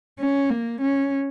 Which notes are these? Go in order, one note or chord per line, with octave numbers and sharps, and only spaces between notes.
C#4
A#3
C#4